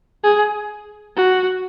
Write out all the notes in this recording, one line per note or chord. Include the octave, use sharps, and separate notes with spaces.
G#4
F#4